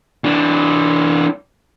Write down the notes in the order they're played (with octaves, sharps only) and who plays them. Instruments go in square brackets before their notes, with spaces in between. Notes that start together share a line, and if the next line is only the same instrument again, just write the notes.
[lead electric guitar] E3 D4